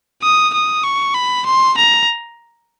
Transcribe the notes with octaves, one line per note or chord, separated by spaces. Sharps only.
D#6
D#6
C#6
B5
C6
A#5